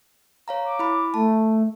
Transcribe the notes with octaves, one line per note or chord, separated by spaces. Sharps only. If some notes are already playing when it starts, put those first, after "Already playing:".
C#5 F5 A#5
D6
E4 B5
A3 A5